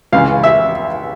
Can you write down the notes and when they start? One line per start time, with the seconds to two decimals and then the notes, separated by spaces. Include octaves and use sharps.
0.12 C#2 C#3 E3 F5
0.44 E5